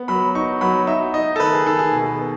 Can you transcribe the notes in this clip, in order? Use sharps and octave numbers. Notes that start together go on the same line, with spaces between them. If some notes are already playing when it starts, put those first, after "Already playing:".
Already playing: B3
F#3 B5
D#4 C#6
F#3 B5
D#4 E5
D#4 D#5
A4
D#3 B4
G#4
D#3 A4
G#4
B2
B3